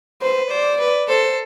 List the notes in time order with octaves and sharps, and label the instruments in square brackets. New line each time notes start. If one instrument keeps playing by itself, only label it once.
[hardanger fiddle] B4 [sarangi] C5
[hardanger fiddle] C5 [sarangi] D5
[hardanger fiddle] B4
[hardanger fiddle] A4 [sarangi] C5